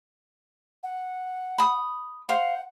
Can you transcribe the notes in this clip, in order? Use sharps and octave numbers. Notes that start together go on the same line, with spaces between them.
F#5
B5 D#6
C5 F5 F#5